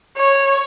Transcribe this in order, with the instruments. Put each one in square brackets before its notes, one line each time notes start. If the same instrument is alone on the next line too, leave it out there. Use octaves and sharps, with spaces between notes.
[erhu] C#5